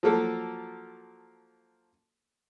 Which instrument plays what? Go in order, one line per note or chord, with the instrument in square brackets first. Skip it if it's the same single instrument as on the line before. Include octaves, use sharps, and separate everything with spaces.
[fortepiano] F3 F#3 A#3 A4